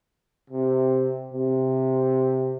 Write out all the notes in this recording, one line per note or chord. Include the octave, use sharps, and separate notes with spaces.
C3
C3